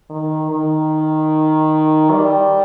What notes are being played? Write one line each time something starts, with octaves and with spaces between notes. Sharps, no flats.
D#3
D#3
G3